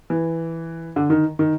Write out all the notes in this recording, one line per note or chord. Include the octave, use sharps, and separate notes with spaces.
E3
D3
D#3
D#3